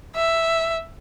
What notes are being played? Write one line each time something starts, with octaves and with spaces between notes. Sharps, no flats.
E5